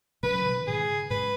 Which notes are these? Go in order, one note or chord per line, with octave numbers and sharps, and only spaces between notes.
C#3 F#3 B4
B2 D#3
G#2 C#3 G#4
G#2 C#3 B4